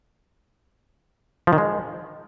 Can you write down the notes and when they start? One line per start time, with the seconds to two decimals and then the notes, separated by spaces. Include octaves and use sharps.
1.47 F3
1.53 D#3
1.58 G#3